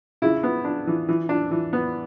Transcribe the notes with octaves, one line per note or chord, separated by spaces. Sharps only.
C#3 E4
B3
D4
E3
E3
D4
E3
B3